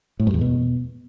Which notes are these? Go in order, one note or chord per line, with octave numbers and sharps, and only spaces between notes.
A2
G2
E2
B2